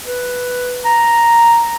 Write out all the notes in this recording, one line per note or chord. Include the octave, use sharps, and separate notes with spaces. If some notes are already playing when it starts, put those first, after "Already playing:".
B4
A#5